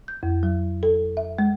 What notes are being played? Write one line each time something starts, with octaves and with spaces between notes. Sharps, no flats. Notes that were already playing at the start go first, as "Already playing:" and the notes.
G6
F2
F#3
A4
E5
G#3